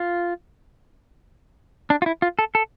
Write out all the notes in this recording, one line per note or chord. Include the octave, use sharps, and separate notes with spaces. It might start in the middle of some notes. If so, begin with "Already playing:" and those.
Already playing: F4
D4
F4
E4
F4
A4
A4